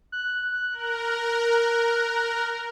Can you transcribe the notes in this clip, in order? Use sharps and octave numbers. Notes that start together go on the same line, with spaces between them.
F#6
A#4